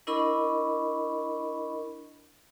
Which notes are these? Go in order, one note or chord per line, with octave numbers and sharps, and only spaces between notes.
D4 E4 A#4 D#5 B5 C#6